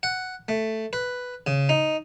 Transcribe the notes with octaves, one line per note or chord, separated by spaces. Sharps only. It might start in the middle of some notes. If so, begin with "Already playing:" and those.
F#5
A3
B4
C#3
D#4